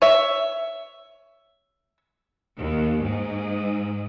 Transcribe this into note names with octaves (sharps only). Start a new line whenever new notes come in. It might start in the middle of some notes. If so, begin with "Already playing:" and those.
C#5 E5
D#2
G#2